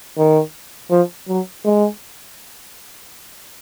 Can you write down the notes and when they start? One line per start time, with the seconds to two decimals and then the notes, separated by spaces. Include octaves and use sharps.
0.17 D#3
0.90 F3
1.28 F#3
1.64 G#3